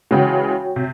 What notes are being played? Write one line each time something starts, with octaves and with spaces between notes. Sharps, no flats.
C#3 E3 G#3 F#4 C#5 G5
C3